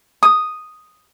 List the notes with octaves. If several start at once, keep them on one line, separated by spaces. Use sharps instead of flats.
D#6